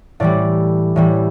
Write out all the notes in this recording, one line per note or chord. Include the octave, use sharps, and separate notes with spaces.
A2 E3 G3 D5
A2 E3 G3